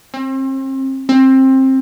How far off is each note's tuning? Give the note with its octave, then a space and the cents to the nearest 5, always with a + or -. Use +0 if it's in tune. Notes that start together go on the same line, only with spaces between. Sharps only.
C4 +35
C4 +20